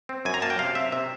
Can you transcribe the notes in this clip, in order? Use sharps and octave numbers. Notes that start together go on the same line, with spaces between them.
C4
F#2 G#5
A#5
A#3 A5
G5
C3 F5
C4 E5
C3 E5